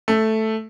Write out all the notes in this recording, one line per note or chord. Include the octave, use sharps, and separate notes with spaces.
A3